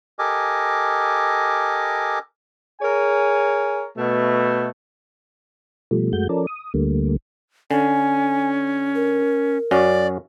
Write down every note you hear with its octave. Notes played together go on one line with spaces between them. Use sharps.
G4 A4 A#4 D#5 G#5 D6
G#4 A#4 C#5 G#5
B2 A3
B2 F3 G3 A3
F#2 G#3 A3 F#4 G6
F3 C#4 A4 A#4 D5
D#6
D2 D3 G3 A3 A#3
D3 C#4 G#5
A#4
F#2 C#4 F#4 D5